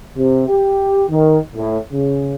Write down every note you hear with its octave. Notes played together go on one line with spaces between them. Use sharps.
C3
G4
D#3
A2
C#3